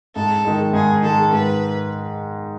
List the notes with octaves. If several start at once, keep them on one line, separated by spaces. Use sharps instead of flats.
G#2 A4
D#3 G#3
G#2 G#4
D#3 G#3 A4
G#2 B4